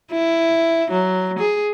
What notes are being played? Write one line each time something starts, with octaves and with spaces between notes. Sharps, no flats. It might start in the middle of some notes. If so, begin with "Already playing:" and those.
E4
F#3
G#4